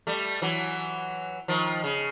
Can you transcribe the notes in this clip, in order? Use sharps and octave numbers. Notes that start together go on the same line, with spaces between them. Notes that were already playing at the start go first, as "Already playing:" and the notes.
G3 A3
E3 F#3
D#3 F3
C#3